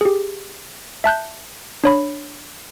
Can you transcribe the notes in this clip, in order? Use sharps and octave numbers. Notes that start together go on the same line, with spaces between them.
G4 G#4
E5 A5 F#6 G6
D4 C#5 B5